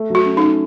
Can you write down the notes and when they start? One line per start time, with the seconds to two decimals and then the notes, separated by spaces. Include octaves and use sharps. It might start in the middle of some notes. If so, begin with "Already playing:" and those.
Already playing: A3
0.10 F#3 F#4
0.25 C#4
0.37 D#4
0.42 C#4